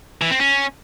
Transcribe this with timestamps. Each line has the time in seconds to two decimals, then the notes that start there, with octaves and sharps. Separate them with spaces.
0.22 E3
0.31 C4
0.40 C#4